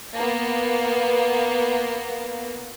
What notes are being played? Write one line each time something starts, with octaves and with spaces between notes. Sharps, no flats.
A#3 B3